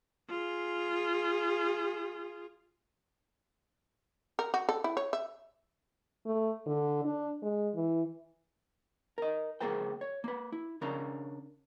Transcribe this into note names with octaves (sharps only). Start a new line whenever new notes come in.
F4 G#4
A#4
F#4
A4
E4
C#5
E5
A3
D3
D4
G#3
E3
A#4 D#5
C#2 A#3 G#4 A#4 C5 G5
C#5
A#3 B4
E4
C#3 C#4 D4 A#4 A#5